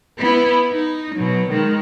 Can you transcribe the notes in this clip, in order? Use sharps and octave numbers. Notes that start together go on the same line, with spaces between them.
B3 E4
D#4
B2 F#3
D#3 G#3